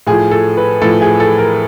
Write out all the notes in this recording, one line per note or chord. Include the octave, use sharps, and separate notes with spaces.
A2 F3 G#4
A4
B4
A2 F3 A4
G#4
A4
A#4